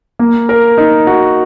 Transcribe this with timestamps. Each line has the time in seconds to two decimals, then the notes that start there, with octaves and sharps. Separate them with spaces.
0.19 A#3
0.49 A#4
0.78 D#4
1.07 F#4